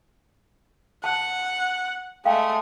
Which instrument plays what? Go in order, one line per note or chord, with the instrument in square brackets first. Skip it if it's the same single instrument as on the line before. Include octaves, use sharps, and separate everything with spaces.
[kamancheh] F#5 [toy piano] A5
[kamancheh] G#3 A3 [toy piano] F5 G5